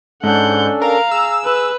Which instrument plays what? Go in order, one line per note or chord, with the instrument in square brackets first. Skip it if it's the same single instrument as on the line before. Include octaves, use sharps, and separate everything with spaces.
[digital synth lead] G#2 [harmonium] C#4 D4 A4 [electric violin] F#5 G6
[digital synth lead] A#4 [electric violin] F5 A#5
[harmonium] G#4 [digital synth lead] E6
[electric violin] B4